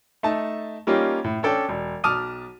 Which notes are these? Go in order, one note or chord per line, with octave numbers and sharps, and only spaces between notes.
A3 D#4 A5
G3 A#3 C#4 D#4 F4 G4
A2
C#4 D4 A4 G5
E1
B1 A5 D6 D#6 F6 D#7